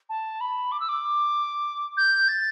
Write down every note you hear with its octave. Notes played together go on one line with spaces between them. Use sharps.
A5
B5
D6
E6
D6
G6
A6